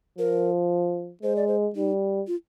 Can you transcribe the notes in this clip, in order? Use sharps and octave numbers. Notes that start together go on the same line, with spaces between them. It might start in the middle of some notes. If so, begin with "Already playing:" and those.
F3 A#4
G#3 C5
D5
C5
G3 D#4
F4